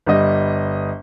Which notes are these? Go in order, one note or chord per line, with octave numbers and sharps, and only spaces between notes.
G1 G3 D#5